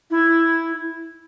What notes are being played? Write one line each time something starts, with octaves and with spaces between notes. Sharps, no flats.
E4